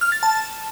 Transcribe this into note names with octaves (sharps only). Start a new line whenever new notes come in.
F6
A6
A5